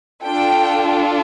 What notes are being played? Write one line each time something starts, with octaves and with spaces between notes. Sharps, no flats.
D4 F4 A4 G5